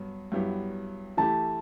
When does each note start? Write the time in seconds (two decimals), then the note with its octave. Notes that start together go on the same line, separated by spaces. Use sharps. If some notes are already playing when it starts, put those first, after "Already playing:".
Already playing: G2 F#3 B3
0.32 G2 F#3 B3 E4 G4
1.17 E3 A3 E4 G4 A5